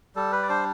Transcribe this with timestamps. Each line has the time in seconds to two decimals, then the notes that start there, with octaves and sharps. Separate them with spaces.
0.16 G3 A4
0.32 B4
0.43 D5
0.49 D4 C5